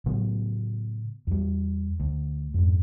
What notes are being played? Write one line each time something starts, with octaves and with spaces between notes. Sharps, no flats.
A2 C#3 F#3 B3
E2 G3
D2
F2 G#2